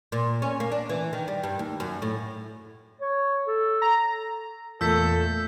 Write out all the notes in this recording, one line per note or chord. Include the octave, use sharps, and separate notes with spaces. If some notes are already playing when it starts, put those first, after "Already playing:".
A#2
C#4
A#3
D4
E3
D#3
G3
G2
D#2
F#2
A2
C#5
A4
A#5
E2 A#2 A3 A4 E6 G6 B6